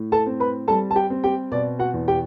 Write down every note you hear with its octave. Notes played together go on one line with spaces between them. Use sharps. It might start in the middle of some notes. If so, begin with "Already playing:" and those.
Already playing: A2
A4 A5
C4
B4 B5
G3 A4 A5
A5
G4 G5
C4
G4 G5
B2 D5
F#4 F#5
E2
G4 G5